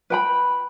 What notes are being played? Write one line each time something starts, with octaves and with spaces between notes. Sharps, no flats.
B4 G5 B5